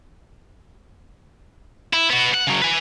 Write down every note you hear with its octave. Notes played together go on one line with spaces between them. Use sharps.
E4
B3 F#4
F#5
C#3 F#3
B4 G#5